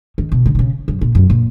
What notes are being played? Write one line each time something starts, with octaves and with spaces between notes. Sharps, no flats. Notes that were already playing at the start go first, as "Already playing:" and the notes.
D#3
B2
C#3
D#3
C#3
F#2
A#2
F#2
A#2